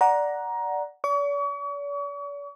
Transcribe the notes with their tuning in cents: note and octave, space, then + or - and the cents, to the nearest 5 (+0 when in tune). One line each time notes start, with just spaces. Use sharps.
D5 +0 F#5 +0 A#5 +15
D5 -45 C#6 +40